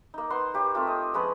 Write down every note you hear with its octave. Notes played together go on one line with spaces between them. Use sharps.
A#3 D#4
B4 C5 F#5 C6
A#3 G4 C#5
A3 C4 F4
D#5
F3 G#3 C#4 B4